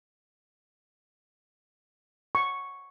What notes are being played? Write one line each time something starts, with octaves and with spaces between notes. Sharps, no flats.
C#6